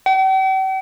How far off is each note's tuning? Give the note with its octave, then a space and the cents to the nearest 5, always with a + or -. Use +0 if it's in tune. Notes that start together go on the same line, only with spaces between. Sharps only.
G5 -45